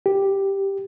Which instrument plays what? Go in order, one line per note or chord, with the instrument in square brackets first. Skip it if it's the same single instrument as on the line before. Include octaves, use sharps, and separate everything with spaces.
[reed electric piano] G4